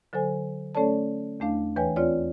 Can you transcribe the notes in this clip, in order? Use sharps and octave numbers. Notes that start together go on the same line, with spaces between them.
D3 F#3 A4 C5 G#5
A3 C#4 A4 C#5 D5 A5
E2 A3 D4 F5
D#2 E3 B4 C#5 G5 G#5
C4 F4 C#5 D5